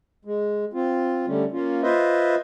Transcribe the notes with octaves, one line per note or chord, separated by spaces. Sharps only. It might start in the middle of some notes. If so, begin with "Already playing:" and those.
G#3
C4 F4
D3 G3 A3 C#4
A#3 C#4 F4
F4 B4 C5 D#5 E5